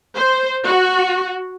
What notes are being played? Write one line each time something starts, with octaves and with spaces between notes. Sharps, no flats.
C5
F#4